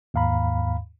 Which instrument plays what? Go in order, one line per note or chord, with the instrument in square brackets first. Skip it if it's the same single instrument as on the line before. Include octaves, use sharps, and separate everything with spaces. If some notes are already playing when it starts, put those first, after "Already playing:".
[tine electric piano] D#2 G#2 F5 A#5 B5